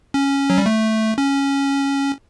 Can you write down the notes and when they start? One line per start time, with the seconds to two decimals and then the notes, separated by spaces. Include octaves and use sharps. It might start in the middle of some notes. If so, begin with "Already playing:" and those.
0.14 C#4
0.50 F#3
0.58 G3
0.66 A3
1.18 C#4